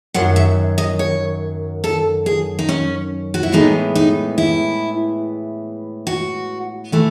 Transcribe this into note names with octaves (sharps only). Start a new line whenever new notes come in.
F#2 D#3 F#3 F#5
E5
D#5
C#5
A4
G#4
D#4
C#4
F#4
E4
A2 E3 G#3 B3 D#4
D#4
E4
F#4
E3 A3